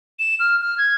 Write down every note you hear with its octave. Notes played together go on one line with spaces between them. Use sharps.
E7
F6
F6
G#6